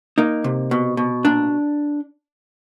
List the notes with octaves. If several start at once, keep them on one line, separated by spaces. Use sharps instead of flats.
A#3 D#4
C3
B2
B2
A#2 D4